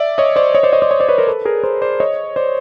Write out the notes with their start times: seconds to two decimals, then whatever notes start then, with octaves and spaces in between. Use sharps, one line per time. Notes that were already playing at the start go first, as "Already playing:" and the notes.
Already playing: D5 E5
0.18 C#5 D#5
0.36 C5 D5
0.55 C#5 D#5
0.63 C5 D5
0.73 C#5 D#5
0.82 C5 D5
0.91 C#5 D#5
1.00 C5 D5
1.08 B4 C#5
1.18 A#4 C5
1.27 A4 B4
1.45 G#4 A#4
1.63 A#4 C5
1.82 C5 D5
2.00 C#5 D#5
2.36 C5 D5